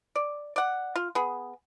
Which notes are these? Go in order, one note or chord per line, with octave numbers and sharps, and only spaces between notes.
D5
D5 F#5
F4
B3 G#4